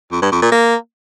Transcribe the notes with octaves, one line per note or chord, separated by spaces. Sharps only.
F2
G2
F2
A#2
A#3